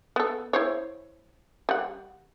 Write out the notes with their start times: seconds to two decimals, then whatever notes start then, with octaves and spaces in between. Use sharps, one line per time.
0.16 B3 A4
0.53 E4 C5 C#5
1.69 G3 F#5